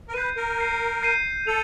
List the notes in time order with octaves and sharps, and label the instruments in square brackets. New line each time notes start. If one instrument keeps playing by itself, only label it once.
[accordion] A#4
[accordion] B4 [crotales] G6 C7 D#7
[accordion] A#4
[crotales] G6 C7 D#7
G6 C7 D#7
[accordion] A4 [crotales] C#7 F7